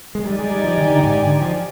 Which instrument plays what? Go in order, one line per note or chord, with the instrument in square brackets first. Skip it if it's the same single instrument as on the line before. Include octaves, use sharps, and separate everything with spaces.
[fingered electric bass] G#3
[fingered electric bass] G3 [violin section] D#4 G4 D5 G#5
[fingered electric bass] G#3
G3
F3
D#3
D3
A#2
G#2
D3
F3